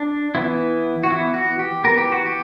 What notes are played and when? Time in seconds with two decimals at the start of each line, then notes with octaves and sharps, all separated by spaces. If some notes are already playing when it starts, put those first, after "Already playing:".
Already playing: D4
0.35 E3 B3 E4
1.03 F#4
1.10 E3 B3 E4
1.34 F#4
1.59 G4
1.84 E3 B3 A#4
1.98 G4
2.12 F#4
2.26 G4